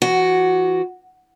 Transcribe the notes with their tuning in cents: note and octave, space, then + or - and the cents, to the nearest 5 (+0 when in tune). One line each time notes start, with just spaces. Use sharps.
E3 +40 F#4 +0